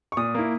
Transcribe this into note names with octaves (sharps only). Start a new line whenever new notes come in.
C#6
A#2 D#6
A#3 E4